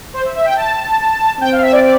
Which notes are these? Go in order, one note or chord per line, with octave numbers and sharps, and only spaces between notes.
C5
E5
E5
G5
A5
C4 G5
F5
E5
D5
D5